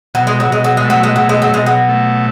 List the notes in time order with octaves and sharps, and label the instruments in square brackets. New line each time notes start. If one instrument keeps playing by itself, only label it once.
[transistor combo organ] B2 [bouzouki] F#3
[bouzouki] G#3
F#3
[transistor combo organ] B2 [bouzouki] G#3
[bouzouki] F#3
G#3
[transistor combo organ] A3
[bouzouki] F#3
G#3
[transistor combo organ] B2 [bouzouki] F#3
[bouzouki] G#3
F#3
[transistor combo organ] B2 [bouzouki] G#3
[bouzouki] F#3
[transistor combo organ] A3